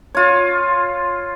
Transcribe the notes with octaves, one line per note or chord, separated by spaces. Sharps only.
F4 C#5